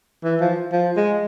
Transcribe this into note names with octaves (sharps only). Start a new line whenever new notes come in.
E3
F3
F3
G#3